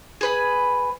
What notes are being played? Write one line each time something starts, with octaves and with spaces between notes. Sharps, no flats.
G#4 B4 B5